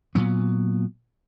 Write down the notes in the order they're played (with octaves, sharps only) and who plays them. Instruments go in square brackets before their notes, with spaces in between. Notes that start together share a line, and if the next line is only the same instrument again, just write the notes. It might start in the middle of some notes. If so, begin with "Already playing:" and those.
[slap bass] A#2 F#3 B3